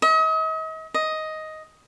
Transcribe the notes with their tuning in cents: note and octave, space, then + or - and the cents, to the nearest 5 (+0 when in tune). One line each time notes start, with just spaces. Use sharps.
D#5 +40
D#5 +10